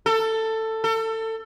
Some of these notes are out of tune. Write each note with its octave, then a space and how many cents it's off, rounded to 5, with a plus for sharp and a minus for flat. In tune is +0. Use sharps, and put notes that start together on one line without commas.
A4 +15
A4 +25